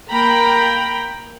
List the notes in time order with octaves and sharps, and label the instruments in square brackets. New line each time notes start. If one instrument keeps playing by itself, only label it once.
[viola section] A#3 G5 A#5 B5